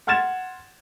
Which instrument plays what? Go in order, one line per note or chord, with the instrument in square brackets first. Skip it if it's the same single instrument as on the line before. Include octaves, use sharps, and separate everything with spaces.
[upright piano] F#5 C6 F6 G#6 A6 E7